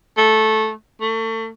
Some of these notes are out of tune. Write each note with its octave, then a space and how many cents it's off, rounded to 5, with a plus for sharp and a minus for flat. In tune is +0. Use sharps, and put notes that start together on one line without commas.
A3 -10
A3 +35